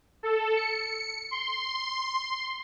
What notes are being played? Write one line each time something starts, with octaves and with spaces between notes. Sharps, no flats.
A4
C#7
C6